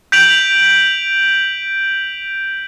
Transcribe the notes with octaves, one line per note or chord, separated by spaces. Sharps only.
G6 B6 D7 F7 F#7